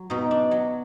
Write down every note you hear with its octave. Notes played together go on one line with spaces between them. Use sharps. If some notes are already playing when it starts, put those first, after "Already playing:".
Already playing: F#3
B2 D#4
D4
F#3